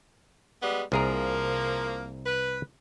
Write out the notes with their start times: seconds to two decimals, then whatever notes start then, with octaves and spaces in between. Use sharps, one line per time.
0.62 G3 G#3 B3
0.92 C2 F3 A#3 G#4 A#4
2.25 B4